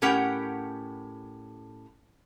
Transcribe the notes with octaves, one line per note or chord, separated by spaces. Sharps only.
A2 C#4 G4 A#4 F#5 G5